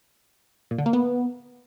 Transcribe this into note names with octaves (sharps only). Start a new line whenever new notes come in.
A#2
D3
A#3
B3